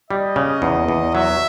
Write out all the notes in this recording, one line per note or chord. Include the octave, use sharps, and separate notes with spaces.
G3 D#5
C#3
E2
E2
F#3 E5